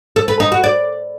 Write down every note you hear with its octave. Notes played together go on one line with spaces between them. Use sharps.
A4
B4
D#4
F#4
D5